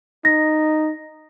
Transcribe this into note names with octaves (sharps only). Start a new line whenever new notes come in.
D#4 A#6